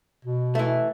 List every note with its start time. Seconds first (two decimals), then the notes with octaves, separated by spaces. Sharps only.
0.25 B2
0.55 E3 A3